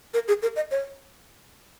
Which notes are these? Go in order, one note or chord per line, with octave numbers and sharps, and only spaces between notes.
A#4
G#4
A#4
D#5
C#5